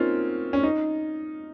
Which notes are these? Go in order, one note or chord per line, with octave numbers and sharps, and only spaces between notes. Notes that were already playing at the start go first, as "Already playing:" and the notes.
Already playing: A#3 C4 C#4 D#4 F4
C#4
D#4